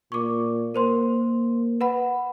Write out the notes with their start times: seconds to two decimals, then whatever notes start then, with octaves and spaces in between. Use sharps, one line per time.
0.12 A#2 C#6 D6
0.74 A#3 A#4 C5 C6
1.81 B4 F#5 B5